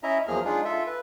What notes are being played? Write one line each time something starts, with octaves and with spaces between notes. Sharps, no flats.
C#4 E4 D#5 E5 A#5
E2 F3 F#3 A#3 G#4 F6
G#3 D4 D#4 F4 G#4
F4 A4 E5
B4